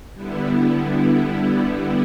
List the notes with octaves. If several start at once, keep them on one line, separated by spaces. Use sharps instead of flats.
D3 G3 B3 E4